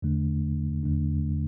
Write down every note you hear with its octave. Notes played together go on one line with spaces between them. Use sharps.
E2 D3 A3 D4
E2 D3 A3 D4